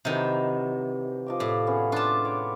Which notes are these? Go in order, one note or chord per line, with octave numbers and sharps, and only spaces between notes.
C3 D#3 E3 F#3
F3 D#5 D6
A2 D5
B3 C#4 G#4
D4 F4 G4 A5
C#5 D6